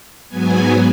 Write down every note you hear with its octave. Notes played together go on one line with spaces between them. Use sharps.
G#2 F#3 B3 G#5